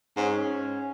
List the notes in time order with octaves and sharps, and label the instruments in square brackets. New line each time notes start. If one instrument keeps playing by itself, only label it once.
[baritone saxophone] G#2 [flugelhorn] C#4